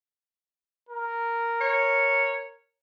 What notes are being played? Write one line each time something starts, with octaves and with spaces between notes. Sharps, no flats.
A#4
C#5